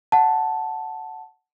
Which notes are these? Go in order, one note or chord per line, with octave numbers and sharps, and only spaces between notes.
F#5 A5